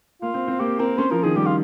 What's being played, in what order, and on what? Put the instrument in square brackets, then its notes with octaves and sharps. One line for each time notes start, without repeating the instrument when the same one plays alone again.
[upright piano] A#3 [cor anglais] F4
[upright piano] C4
C4
[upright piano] A#3 [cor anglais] G4
[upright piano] C4 [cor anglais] A#4
[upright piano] C#4 [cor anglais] C5
[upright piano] F3 [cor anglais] A#4
[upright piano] D#3 [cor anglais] G#4
[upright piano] G3 [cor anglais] G4
[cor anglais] F4